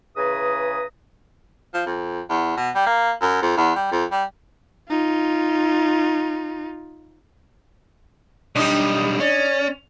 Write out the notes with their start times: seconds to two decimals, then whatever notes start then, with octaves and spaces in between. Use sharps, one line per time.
0.17 C#3 E3 G#4 B4 A#5 D#6
1.74 F3
1.86 F2
2.30 E2
2.57 B2
2.75 G3
2.87 A#3
3.22 F#2
3.42 F2
3.57 E2
3.76 G3
3.92 F2
4.12 G3
4.89 D#4 F4
8.56 B1 G3 D4 D#4 D#6
9.20 C#4 D5